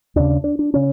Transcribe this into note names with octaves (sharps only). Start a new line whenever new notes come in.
D#2 C#3 D4
D4
D4
C#3 C#4